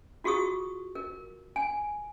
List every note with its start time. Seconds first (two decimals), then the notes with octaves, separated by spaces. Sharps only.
0.24 F4 F#4 G#4 C#6 D#6
0.95 A#4
1.56 G#5